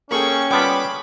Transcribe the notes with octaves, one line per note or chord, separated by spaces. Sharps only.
A#3 C#4 G#4 A4 G5 C#6
G3 B3 F4 G5 A5 B5 D6